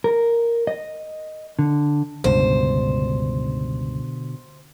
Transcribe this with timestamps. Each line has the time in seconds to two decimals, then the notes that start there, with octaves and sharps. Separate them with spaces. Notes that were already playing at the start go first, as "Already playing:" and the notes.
0.04 A#4
0.67 D#5
1.59 D3
2.24 C#2 G2 B2 D3 C5